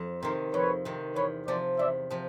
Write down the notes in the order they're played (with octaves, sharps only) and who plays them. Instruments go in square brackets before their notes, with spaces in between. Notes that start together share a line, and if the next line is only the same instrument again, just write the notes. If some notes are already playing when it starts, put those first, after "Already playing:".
Already playing: [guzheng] F2
[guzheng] C3 D#3 [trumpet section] A#4 C5
[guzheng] F2 [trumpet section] B4 C#5
[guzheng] C3 D#3
[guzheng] E2 [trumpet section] B4 C#5
[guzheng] C3 F3 [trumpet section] C5 D5
[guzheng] E2 [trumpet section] D5 E5
[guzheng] C3 F3